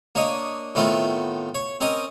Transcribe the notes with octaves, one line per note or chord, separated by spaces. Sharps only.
A#3 D4 C#5 D#5
A2 D#3 A3 B3 C4 F4
C#5
C4 C#4 A#4 D#5 D6